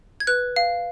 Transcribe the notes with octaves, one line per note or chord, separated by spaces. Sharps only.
G#6
B4 F#6
F5